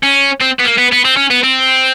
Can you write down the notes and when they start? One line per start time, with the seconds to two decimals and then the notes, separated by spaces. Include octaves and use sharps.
0.03 C#4
0.41 C4
0.60 B3
0.66 A#3
0.78 B3
0.92 B3
1.05 C4
1.17 C#4
1.31 B3
1.44 C4